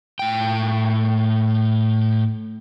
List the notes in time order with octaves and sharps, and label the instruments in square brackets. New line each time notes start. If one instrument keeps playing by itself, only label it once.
[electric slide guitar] A2 G5